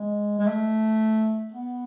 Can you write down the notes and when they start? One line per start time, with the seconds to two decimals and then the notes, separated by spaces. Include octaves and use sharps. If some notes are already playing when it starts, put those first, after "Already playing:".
Already playing: G#3
0.39 G#3
0.47 A3
1.52 B3